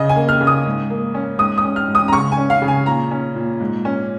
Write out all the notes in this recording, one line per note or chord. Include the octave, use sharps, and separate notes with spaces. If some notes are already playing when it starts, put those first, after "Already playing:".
Already playing: C#3 D#5
G#5
A#3
F6
C#3
D#6
G#2
A#3
C#4
G#2 D#6
D#6
C#4
F6
G#2
D#6
A#5
C#3 C#6
G#5
C#4
F5
C#3
G#5
A#2 A#5
C#4
A#2
G#2
C#4